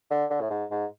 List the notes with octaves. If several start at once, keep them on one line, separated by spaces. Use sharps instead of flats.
D3
D3
A2
G#2
G#2